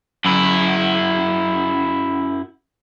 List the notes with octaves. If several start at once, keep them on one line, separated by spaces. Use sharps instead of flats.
F#2 E4